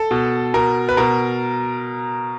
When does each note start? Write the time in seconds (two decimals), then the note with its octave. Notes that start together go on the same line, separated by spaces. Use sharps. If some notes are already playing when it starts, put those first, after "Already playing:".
Already playing: A4
0.11 B2
0.54 B2 A#4
0.89 B4
0.97 B2 A#4